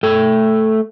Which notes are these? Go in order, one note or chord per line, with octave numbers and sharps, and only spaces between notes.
A3 A4 G5